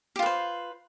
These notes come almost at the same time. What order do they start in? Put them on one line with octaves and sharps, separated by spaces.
G4 F4 B4 C5